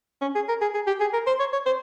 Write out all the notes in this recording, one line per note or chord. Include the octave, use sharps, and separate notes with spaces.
C#4
G#4
A#4
G#4
G#4
G4
G#4
A#4
C5
C#5
C#5
C5